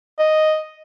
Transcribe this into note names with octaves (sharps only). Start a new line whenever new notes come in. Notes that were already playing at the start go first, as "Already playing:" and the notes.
D#5